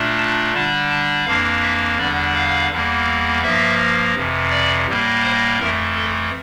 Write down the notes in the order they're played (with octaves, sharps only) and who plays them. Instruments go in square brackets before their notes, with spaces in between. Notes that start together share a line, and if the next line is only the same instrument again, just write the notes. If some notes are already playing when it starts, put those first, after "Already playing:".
Already playing: [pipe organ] A#2 A3 D4
A5
D3 G3 D4 A5
A5
F2 E3 A#3 D4 F5
E5
E2 D3 G3 D4 D5
F5
E2 E3 G3 A#3
G2 F3 A#3 E5
F2 C3 E3
D5
A2 G3 A#3
C5
F2 E3 A3 A#4
A4